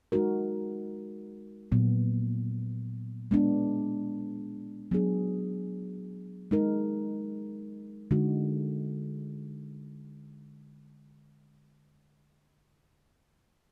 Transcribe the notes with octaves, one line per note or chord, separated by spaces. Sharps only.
G#3 D#4 F#4 A#4
A#2 F#3 B3
G#3 B3 D4
F#3 B3 D4 G#4
G#3 D#4 A#4
D3 G#3 D#4 F#4